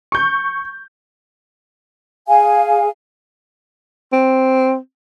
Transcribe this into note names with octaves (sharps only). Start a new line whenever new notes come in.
C#6 G6
G#4 F5 G#5
C4